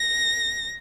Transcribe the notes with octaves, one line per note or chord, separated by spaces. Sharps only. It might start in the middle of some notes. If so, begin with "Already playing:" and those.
Already playing: A#6